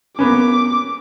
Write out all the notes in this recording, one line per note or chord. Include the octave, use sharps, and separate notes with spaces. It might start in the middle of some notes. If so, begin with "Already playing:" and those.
A#3 B3 C#4 D6